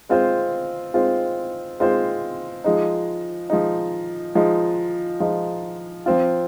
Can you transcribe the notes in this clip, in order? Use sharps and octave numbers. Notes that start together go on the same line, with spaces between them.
G#3 C4 F4 C5
G#3 C4 F4 C5
G#3 C4 F4 C5
F3 G#3 D#4
F3 G#3 D#4
F3 G#3 D#4
F3 G#3 D#4
F3 C4 F4